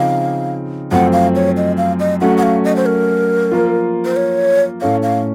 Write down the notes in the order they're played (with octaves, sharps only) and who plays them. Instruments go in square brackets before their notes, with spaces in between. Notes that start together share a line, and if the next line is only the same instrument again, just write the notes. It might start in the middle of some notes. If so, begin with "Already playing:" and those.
Already playing: [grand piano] C#3 F3 C4 D#4 [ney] F5
[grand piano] F#2 F3 A3 C4 [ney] F#5
[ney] F5
C#5
D#5
F5
D#5
[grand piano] F#3 A3 C#4 F#4 [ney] F#5
[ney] F#5
F5
D#5
C5
A#4
[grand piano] F3 A#3 F4
[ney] C5
C#5
[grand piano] A2 A3 C#4 A4 C#5 [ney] F5
[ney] F5